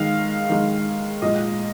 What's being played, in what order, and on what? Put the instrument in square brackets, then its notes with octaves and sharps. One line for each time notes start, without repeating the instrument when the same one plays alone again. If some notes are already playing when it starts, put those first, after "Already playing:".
Already playing: [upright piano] D#3 G#3 F5
D#3 G#3
A#2 G#3 D#5